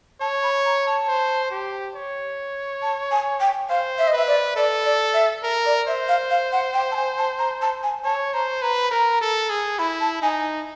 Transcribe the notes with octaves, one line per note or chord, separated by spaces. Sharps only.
C#5 A5
B5
A#5
A5
C5
G4
C#5
A5
G#5
G5
C5 F5
E5
D#5
B4 E5
D5
A4 D5
D5
E5
A#4
D5
C5 E5
F5
F5
F#5
G5
A5
G#5
A5
A#5
A5
G#5
C#5 A5
C5 A#5
B4 A#5
B5
A#4 A#5
A4
G#4
E4 B5
A5
D#4 G#5